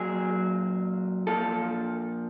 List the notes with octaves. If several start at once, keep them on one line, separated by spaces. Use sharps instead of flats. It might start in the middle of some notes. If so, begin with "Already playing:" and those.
Already playing: A#2 F#3 G#4
A#2 F3 A4